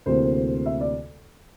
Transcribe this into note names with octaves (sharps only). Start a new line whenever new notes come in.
D2 C3 E3 A#3 C5
E5
D5